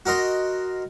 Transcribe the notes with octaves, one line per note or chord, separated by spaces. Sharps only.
F#4 A#4 D#5 C6